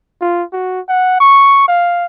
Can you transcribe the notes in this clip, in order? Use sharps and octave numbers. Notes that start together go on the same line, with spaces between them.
F4
F#4
F#5
C#6
F5